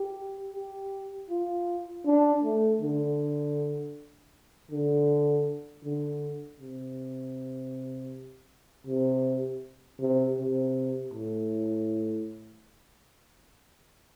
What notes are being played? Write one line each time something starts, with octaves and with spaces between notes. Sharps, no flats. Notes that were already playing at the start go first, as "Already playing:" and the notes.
Already playing: G4
G4
F4
D4
A3
D3
D3
D3
C3
C3
C3
C3
A2